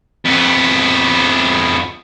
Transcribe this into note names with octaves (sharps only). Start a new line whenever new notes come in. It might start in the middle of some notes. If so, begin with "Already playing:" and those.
F2 B3